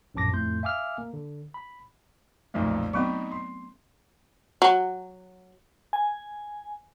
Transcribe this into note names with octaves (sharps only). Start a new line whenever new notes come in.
A#1 F#2 A2 A5 D6 A#6
F2 A2 A3 C6 G6
E5 F5 G#5 D6 E6 F6
A#3
D3
B5
B1 F2 A#2 A3 D#4
F#3 B3 C4 D#4 B5 C#6
C6
F#3
G#5